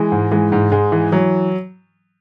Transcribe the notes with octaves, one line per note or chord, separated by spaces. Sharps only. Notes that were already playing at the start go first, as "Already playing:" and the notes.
Already playing: E3 G#3
G#2
E3 G#3
G#2
G#2 G#3
E3
E3 F#3